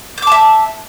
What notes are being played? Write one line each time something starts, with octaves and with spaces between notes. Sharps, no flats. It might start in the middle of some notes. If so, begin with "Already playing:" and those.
E5 A5 D6 G6